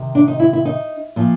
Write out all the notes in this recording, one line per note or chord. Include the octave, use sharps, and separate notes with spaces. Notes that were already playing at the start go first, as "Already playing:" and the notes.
Already playing: C3 D#3
D4
D#4
E4
E4
D#4
A#2 F3